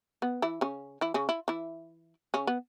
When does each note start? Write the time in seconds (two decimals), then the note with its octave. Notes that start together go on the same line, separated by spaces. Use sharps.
0.22 B3
0.42 E3 E4
0.61 C#3 C#4
1.01 E3 E4
1.14 C#3 C#4
1.29 E4
1.48 E3 E4
2.34 C#3 C#4
2.47 B3